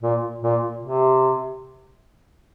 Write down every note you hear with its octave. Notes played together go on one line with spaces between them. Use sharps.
A#2
A#2
C3